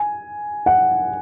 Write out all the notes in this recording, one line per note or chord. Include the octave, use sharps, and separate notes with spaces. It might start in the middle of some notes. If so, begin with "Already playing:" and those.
Already playing: G#5
F#5